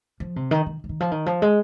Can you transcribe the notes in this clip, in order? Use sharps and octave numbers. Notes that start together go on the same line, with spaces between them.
F3
C3
D#3
D#3
F3
D#3
F3
D#3
F3
G#3